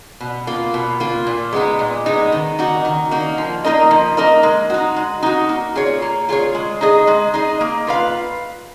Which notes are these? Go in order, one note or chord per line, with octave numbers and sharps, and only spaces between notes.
B2
A#3 F4
B2
A#3 F4
A#2
G#3 B3 D#4
A#2
G#3 B3 D#4
D#3
A#3 D#4 F#4
D#3
A#3 D#4 F#4
F3
A#3 D#4 A#4 D#5
F3
A#3 D#4 A#4 D#5
G#3
D#4 F#4
G#3
D#4 F#4
A#3
F4 G#4 C#5
A#3
F4 G#4 C#5
G#3
D#4 G#4 D#5
G#3
D#4 G#4 D#5
A#3
F4 B4 F5